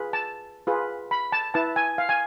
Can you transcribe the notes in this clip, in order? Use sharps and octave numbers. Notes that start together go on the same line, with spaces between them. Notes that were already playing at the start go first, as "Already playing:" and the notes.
Already playing: F4 G#4 B4
A5
F4 G#4 B4
B5
A5
E4 B4 A5
G#5
F5
G#5